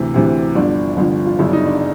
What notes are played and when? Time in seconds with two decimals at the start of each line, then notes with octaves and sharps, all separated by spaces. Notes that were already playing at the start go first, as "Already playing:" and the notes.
Already playing: D2 C3 E3
0.14 D2 C3 E3
0.55 G1 G2 D3 F3 D4
0.97 G1 G2 D3 F3
1.26 F4
1.39 G1 F#2 C#3 E4
1.48 D4
1.53 D#4
1.66 D4